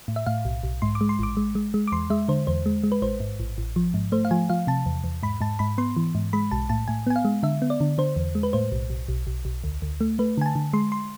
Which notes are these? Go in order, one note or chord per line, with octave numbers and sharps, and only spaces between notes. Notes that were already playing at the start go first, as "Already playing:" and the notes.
A2
E5
A2 F5
B1
B1
G#2 C6
D6
G#3
C6
A1 D6
G#3
G#3
G#3
D6
E2 C6
G#3 E5
D3 C5
E2 C5
G#3
G#3
B4
A1 C5
G#2
A1
A1
F3
G#2
A3 C5
F5
F3 G#5
F3 F5
C3 A5
E2
E2
G#2 B5
G#2 A5
G#2 B5
B3 C6
E3
G#2
G#3 B5
B1 A5
A2 A5
A2 G#5
B3 G#5
F5
G#3
D3 E5
B3
D5
D3
D3 C5
E2
G#3
B4
A2 C5
B1
B1
B1
B1
B1
D2
D2
A3
A3 B4
D3 G#5
A5
D3
G#3 C6
C6